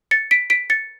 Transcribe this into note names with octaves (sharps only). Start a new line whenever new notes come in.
A6 C#7
B6 D7
B6 D7
A6 C#7